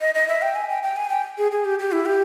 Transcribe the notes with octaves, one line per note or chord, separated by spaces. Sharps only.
D#5
D#5
E5
G5
G#5
G5
G5
G#5
G5
G#4
G#4
G4
G4
E4
G4